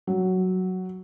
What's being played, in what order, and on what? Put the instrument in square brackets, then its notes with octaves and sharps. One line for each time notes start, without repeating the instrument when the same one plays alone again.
[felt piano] F#3